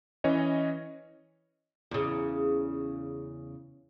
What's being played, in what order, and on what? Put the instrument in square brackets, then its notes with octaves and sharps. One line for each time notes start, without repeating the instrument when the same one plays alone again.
[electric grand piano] E3 C#4 C#5 D#5
[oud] E2 C#3